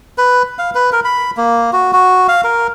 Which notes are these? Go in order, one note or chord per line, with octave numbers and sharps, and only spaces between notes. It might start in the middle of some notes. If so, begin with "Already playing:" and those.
B4
F5
B4
A#4
B5
A#3
F#4
F#4
F5
A#4